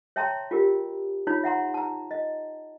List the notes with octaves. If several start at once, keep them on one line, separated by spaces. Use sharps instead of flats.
C#5 E5 G5 A5 A#5 C6
F4 G4 A#4
D#4 F4 C#5 B5
E5 F#5 A#5 C6
A5 A#5
D#5